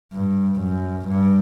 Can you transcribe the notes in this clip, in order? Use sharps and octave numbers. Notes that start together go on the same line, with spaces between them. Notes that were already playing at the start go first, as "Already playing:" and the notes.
G2
F#2
G2